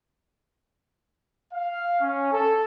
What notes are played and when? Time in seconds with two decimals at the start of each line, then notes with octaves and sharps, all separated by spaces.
1.54 F5
2.01 C#4
2.32 A4